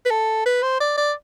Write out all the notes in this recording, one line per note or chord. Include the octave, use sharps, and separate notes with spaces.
B4
A4
B4
C5
D5
D5